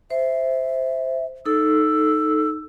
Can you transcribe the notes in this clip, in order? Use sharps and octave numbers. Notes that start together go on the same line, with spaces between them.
C5 E5
D#4 A4 E6